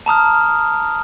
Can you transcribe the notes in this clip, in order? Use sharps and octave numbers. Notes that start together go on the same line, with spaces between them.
A5 A#5 D#6 F6